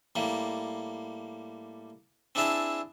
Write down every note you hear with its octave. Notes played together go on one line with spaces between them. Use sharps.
A2 G3 A#3
C4 D4 E4 G#4 E5 A5